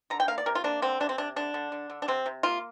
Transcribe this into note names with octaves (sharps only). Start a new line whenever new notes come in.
D3 A#5
G5
A#3 F5
D5
C3 A#4
F4
A#3 D4
D3 C4
C3 D4
C4
C3 D4
D3 D4
D3
D3
D3
D4
C3 C4
C3
A#3 F4